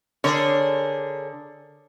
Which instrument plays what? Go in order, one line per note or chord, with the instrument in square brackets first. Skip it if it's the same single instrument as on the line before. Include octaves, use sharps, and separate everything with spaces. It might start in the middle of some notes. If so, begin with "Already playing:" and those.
[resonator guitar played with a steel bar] D3 [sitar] G#4 A#4 C#5